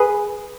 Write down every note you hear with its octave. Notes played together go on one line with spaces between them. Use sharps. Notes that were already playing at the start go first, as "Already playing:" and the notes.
Already playing: G#4 B4